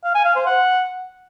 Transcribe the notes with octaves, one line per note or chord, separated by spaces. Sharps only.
F5
G#5
F5
C5
F#5